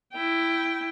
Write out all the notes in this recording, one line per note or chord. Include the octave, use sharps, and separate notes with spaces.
E4 G5